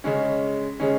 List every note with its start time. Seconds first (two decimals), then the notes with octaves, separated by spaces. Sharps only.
0.04 C#3 G#3 C#4
0.80 C#3 G#3 C#4